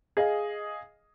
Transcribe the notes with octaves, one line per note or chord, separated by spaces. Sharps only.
G#4 D#5 F5